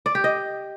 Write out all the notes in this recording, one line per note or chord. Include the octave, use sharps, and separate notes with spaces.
D5
G4
D#5